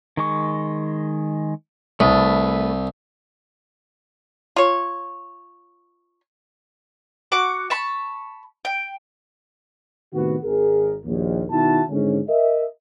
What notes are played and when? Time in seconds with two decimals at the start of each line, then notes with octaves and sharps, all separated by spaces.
0.17 D#3 G#3 C#6
2.00 C2 A3 B4 A5
4.56 F4 C#5
7.32 F#4 F#5 C#6 D6
7.70 A5 B5 C#6
8.65 G5
10.13 A2 C3 D#3 B3 F#4
10.44 G#1 G#4 A#4
11.05 A#1 D#2
11.50 B2 D#3 D#4 E4 F#4 A5
11.89 G#1 G#2 D3 C#4
12.28 A#4 D#5 E5